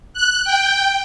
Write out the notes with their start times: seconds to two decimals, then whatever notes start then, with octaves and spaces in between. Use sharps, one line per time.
0.14 F#6
0.44 G5